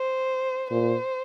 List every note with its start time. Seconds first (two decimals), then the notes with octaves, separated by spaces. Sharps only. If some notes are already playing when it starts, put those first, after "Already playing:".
Already playing: C5
0.71 A#2 C5